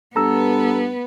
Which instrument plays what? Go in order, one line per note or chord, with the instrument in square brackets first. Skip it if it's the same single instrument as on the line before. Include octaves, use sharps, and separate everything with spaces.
[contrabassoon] G2 [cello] B3 B4 [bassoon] A4 [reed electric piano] A#5 E6